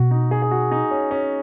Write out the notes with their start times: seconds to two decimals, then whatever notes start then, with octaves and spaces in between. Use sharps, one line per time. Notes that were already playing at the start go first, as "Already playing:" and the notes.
Already playing: B2 F#4
0.11 D#4
0.31 G#4
0.42 G#4
0.51 F#4
0.71 D#4
0.91 C#4
1.11 C#4